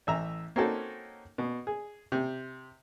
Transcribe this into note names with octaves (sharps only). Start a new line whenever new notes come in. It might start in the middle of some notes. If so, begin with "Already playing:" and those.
A1 E5 A#5
A#3 C4 C#4 D#4 F#4 A4
B2
G#4
C3